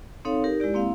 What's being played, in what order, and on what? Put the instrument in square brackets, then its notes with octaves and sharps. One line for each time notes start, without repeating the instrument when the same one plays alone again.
[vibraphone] C4 D#4 A4 C#5 F5
D#4 G4 A#4
G#3 E4 G4 D5
A#3 C4 E4 F5